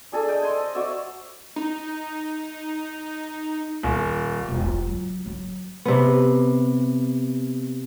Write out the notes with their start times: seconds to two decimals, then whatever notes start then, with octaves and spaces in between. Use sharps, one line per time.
0.12 D4 G#4 A4 G#5
0.28 D#5 G5
0.40 C5 G#5 C6
0.61 D#5
0.75 F#4 D5 E5
1.56 D#4
3.83 D#1
4.48 E1
4.66 F4
4.87 F#3
5.26 F#3
5.85 C3 B3